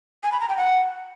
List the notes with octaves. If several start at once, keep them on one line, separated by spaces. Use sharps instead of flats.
G#5
B5
A#5
G5
F#5